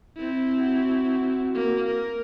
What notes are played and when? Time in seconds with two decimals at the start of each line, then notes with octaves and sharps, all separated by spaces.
0.17 C4 E4
0.59 F#4
1.55 A#3
1.86 A#4